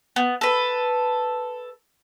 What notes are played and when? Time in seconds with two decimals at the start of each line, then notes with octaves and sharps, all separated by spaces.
0.16 B3
0.41 A4 B4